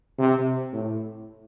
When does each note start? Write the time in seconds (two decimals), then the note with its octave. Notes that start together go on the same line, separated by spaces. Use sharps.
0.19 C3
0.72 A2